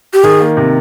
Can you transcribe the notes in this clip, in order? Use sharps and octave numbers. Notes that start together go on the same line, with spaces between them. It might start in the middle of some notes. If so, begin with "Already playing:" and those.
G4
D#3 G#4
A#3
C3